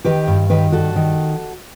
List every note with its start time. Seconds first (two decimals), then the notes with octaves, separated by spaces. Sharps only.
0.05 D#3 G4 B4
0.28 G2
0.49 D#3 G4 B4
0.72 G2 F#4 A4
0.96 D#3